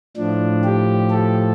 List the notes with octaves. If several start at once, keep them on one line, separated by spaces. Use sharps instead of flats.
A2 F3 D4
G4
A4